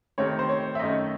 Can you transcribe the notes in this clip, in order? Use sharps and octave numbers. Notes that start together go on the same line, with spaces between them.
C3 D#3 A3 C4 C#5
C5
C#5
E5
F#2 D#3 A3 C#4 D#5